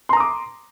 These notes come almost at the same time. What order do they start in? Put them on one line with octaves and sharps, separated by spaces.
C6 A#5 D#6 D6